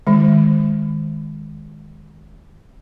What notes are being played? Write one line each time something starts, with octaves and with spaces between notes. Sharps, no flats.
D#3 G#3